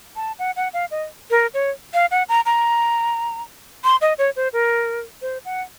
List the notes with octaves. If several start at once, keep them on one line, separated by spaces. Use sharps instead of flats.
A5
F#5
F#5
F5
D#5
A#4
C#5
F5
F#5
A#5
A#5
C6
D#5
C#5
C5
A#4
C5
F#5